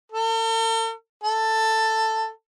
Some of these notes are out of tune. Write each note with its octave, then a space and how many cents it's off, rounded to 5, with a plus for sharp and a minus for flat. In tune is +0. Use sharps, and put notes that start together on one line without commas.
A4 +45
A4 +10